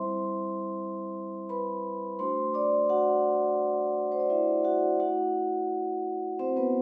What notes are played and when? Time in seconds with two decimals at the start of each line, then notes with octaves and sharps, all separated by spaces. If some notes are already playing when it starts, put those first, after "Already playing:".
Already playing: G3 C4 E4 C5 E5 C6
1.49 B4 B5
2.19 A3 D4 F#4 C5 C6
2.54 D5 D6
2.89 F#4 F#5
4.12 C5
4.20 D5
4.30 E4 E5
4.64 F#4 F#5
5.00 A3 E4 F#4 F#5
6.39 C4 C5
6.56 B3 B4